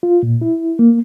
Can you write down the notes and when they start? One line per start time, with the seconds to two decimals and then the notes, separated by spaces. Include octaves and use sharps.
0.03 F4
0.23 A#2
0.41 E4
0.79 A#3